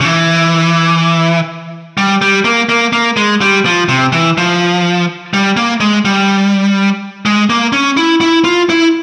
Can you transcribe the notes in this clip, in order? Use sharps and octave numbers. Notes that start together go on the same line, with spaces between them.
C#3
E3
G3
G3
A#3
A#3
A#3
G#3
G3
F3
C3
E3
F3
G3
A#3
G#3
G3
G#3
A#3
C#4
E4
E4
F4
E4